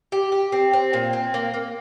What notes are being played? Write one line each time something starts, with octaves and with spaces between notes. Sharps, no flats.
G4
G4
C4
C4
A#2
C4
A#3
A#3